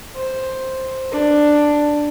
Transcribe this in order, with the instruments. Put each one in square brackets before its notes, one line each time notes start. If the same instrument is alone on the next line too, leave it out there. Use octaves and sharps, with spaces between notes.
[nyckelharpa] C5
D4